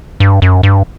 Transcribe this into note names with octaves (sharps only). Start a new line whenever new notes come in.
G2
F#2
G2